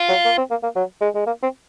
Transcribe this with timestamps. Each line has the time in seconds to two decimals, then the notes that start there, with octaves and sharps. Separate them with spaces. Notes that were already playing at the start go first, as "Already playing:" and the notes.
Already playing: F4
0.09 F#3
0.25 A#3
0.38 C4
0.50 A#3
0.63 A#3
0.76 F#3
1.01 G#3
1.15 G#3
1.26 A#3
1.43 C4